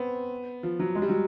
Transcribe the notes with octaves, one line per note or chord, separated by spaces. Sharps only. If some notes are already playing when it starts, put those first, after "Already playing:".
Already playing: B3 C4
F3
F#3
G#3
G3
F#3